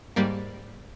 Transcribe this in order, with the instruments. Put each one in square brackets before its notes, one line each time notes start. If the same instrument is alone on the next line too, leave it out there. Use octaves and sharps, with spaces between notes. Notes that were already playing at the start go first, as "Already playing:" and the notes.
[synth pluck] G#2 G3 A#3